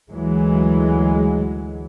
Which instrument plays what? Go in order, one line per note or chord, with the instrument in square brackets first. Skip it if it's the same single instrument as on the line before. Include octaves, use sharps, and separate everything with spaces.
[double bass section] D2 E3 F#3 G#3